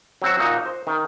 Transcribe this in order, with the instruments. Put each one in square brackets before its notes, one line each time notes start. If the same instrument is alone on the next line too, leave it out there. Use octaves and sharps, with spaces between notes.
[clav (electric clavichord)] F#3 C4 F#4
A#2 D#4 F#4
C5
D#3